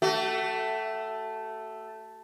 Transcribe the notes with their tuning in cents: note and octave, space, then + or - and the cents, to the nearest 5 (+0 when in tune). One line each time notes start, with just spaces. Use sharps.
A3 +0 F#4 +40